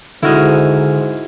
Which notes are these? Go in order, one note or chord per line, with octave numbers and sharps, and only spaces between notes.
G#2 D3 E4 F#4 D#5 F6